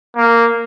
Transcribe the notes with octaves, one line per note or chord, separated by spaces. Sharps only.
A#3